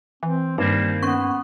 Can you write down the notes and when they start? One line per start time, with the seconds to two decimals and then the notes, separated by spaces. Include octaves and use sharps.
0.23 E3 C4
0.58 G2 D#3 G3 A#3 C4 D#4
1.03 B3 C#4 C#6